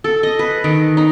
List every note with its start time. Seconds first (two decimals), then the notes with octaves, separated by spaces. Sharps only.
0.04 A4
0.23 D#5
0.39 B4
0.64 D#3
0.97 D#4